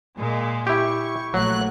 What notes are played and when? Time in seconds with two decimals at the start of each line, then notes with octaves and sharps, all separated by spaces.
0.18 A#2 G#3
0.67 E4 G4 C#6
1.34 A#1 F#3 A3 F#6